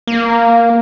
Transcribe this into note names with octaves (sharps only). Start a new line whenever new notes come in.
A#3